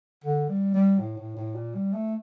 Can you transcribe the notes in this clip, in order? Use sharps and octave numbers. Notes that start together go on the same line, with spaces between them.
D3
G3
G3
A2
A2
A2
A#2
G3
A3